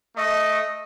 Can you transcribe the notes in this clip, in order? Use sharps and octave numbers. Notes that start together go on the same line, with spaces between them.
A3 D#5